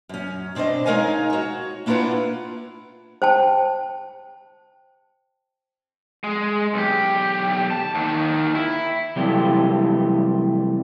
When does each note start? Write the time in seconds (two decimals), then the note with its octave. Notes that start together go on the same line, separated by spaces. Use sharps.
0.09 F#2 C#4
0.55 B2 C4 D4 C5 D#5
0.86 G#3 D#4 A#4 C#5 F5 G#5
1.30 F#4 C#5
1.86 A#3 D4 E4 F4 B4 F#5
3.22 C5 G5 A5
6.24 G#3
6.74 B1 G4
7.71 A5
7.95 D#2 D#3
8.55 E4
9.16 C3 E3 F#3 G3 A3 G4